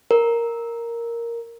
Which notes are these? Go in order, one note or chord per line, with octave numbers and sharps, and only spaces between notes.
A#4